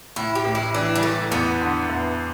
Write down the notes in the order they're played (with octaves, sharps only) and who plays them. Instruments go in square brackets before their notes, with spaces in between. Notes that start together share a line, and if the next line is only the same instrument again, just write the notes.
[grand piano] A2 [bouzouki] E4
[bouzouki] G4
[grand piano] A1
[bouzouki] E4
[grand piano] E3 [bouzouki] D4
[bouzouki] G3
[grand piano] E3 [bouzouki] A3
[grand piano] E2 [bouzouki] B3
[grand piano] D3
E2